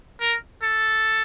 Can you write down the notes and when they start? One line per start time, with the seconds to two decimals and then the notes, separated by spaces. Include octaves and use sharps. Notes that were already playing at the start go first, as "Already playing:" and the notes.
0.20 A#4
0.62 A4